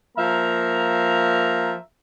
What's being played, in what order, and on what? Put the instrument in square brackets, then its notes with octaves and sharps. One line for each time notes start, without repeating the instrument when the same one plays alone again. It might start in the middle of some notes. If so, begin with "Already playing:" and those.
[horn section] F3 A#3 E5 F5 A#5